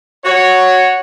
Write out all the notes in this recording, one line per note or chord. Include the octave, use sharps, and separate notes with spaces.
F#4 C#5